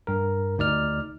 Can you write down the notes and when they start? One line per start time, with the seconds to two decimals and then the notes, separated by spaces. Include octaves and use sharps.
0.07 G2 A#4
0.58 D2 D#4 D5 F6